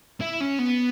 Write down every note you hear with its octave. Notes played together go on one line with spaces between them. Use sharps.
E4
C#4
B3